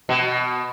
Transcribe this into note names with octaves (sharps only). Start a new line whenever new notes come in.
B2